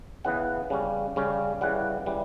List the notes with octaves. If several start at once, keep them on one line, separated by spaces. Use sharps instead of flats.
C#3 E3 B3 F#5
C#3 G3 C#4
C#3 G3 C#4
C#3 E3 G3 F#5
C#3 E3 G3